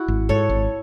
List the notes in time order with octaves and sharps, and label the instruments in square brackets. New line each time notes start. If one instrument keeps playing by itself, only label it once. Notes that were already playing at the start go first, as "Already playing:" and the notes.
Already playing: [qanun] E4 F#4
[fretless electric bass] G#1
[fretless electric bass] G#2 [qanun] A4 C#5
[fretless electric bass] G#1